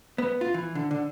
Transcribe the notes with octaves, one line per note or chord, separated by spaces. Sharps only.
B3
F4
E3
D3
D3